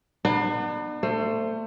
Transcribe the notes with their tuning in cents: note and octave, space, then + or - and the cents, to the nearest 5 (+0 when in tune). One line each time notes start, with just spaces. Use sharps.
B3 -20 D4 +45
A3 +30 C5 +5